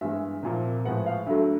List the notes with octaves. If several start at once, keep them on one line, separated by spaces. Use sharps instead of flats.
G2 E3 G#3 B3 E5
C2 A#2 F3 A#3
A2 F3 G#3 B3 F#5
F5
D2 D3 F#3 A3 E5